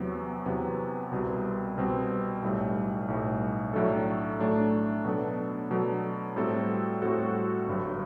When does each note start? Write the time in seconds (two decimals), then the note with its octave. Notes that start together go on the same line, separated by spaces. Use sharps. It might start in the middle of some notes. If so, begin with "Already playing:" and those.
Already playing: E2 C3 F#3 B3
0.46 E2 C3 F#3 B3
1.11 C2 B2 G3 C4
1.77 C2 B2 G3 C4
2.43 B1 A2 G3
3.08 B1 A2 G3
3.73 A2 F#3 A3 D4 A4
4.39 A2 F#3 A3 D4 A4
5.05 B2 F#3 B3 D4 A4
5.71 B2 F#3 B3 D4 A4
6.36 A2 G3 C4 F#4 A4
7.02 A2 G3 C4 F#4 A4
7.67 G1 G2 F#3